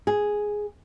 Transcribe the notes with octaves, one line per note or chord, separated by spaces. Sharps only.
G#4